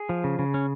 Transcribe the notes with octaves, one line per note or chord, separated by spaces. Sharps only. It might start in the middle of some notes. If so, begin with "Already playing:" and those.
Already playing: G#4
F3
C#3
C#3
C#4